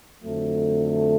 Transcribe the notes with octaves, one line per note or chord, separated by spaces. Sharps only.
F2 D3 F#3 A3